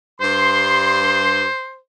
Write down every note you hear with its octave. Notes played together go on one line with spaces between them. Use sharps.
G2 C5 C6